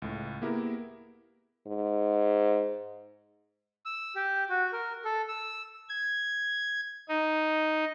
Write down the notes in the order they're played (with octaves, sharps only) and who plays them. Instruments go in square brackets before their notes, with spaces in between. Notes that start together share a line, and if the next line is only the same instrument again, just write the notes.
[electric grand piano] C#2 A2
A#3 B3 E4 G4 G#4 A#4
[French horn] G#2
[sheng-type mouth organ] E6
G4
F#4
A#4
A4
E6
[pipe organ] G#6
D#4